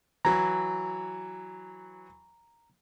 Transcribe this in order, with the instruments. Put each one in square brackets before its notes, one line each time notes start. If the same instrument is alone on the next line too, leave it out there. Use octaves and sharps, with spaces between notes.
[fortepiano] E3 F#3 [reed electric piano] A#5